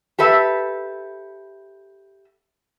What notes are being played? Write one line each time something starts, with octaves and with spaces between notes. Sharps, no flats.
G4 A4 B4 E5